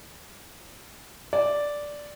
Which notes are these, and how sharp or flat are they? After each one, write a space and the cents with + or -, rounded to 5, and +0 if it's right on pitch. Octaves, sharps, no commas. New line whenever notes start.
D5 -5